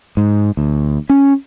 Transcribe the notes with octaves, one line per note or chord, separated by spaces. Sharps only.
G#2
D2
C#4